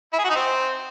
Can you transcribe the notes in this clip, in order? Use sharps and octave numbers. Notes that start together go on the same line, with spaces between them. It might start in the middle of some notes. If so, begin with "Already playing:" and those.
E4
G#4
F#4
D#4
C4